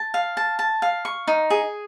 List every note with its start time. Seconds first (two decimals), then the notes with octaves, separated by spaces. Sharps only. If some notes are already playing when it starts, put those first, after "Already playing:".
Already playing: A5
0.14 F5
0.37 A5
0.59 A5
0.82 F5
1.05 C#6
1.28 D#4
1.50 G#4